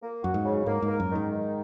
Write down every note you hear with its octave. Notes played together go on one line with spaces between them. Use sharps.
A#3
F#2 F#4
G#2
C#3
G#2 A#3
G#2
A#4
F#2
D#3
G#2
D#3